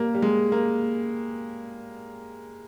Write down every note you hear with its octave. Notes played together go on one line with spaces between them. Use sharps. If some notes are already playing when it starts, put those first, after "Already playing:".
Already playing: G3 A#3
G3
G#3
A#3